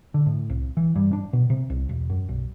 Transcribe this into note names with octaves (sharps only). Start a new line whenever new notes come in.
D3
A2
C2
E3
G2
D4
B2
C3
C2
E1
F#2
B1